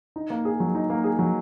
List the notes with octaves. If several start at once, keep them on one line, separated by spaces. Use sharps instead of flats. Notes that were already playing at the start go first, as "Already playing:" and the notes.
D#4
A#3
G#4
F#3
D#4
A#3
G#4
F#3